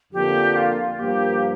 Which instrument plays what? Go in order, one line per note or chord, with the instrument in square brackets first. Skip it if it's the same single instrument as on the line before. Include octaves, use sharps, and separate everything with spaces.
[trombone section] F2 D3 F3 A#3 D4 [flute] G4
[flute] F4
[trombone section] G2 F3 A#3 [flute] G4